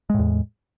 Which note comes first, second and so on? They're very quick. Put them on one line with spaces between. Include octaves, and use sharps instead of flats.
G#3 A2 E2